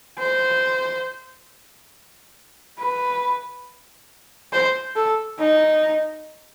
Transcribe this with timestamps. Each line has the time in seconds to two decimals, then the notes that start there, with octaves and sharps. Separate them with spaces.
0.19 C5
2.79 B4
4.53 C5
4.96 A4
5.39 D#4